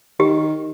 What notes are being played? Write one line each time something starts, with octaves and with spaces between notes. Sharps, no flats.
D#3 G4